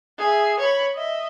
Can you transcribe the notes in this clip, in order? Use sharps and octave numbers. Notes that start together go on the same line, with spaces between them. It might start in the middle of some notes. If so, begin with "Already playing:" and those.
G#4 E5
C#5 B5
D#5 E5